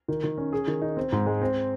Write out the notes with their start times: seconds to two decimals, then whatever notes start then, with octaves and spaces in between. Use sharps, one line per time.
0.08 D#3
0.24 D#3
0.38 C#4
0.53 G#4
0.68 D#3
0.82 D#4
0.97 C4
1.12 G#2
1.26 G#3
1.42 C4